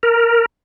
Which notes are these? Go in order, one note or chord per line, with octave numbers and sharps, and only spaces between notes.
A#4